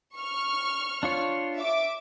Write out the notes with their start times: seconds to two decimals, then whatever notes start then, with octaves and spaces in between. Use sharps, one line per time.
0.16 C#6 F6
1.03 D4 F4 C#5
1.56 E5 D6